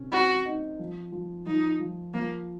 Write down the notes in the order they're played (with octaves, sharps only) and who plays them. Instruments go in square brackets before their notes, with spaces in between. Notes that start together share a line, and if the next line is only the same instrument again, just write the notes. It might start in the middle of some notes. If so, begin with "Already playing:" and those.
Already playing: [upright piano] C3 C#4
[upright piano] C4 [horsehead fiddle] F#4
[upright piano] D#4
F3
F3
[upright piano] F3 [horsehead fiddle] D#4
[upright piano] F3
[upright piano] F3 [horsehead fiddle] A#3